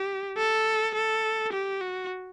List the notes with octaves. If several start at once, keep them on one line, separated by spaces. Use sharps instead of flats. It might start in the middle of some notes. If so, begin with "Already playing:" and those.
Already playing: G4
A4
A4
G4
F#4